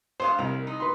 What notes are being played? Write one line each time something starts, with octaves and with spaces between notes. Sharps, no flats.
G2 B3 C5 F5
C2 F2 A#4
D#4
B4 C6